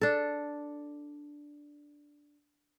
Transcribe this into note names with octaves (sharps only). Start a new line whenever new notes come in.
D4 A4